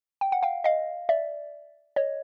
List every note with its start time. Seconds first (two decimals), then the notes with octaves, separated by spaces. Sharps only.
0.21 G5
0.32 F#5
0.43 F5 G5
0.64 D#5 F5
1.09 D5 E5
1.96 C#5 D#5